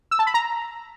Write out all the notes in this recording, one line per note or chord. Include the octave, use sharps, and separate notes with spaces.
E6
A5
B5
A#5